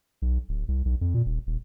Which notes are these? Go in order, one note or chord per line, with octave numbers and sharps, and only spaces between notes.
B1
D1
C2
B1
F2
A#2
D#1
D#1